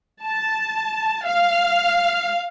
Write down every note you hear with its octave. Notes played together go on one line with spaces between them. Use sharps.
A5
F5